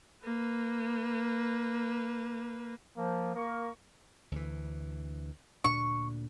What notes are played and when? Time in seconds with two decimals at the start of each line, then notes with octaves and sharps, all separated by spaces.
0.24 A#3 B4
2.97 F3 A#3
3.35 A#3 A#4 C#6
4.32 D2 E3
5.64 D2 A#2 D4 C#6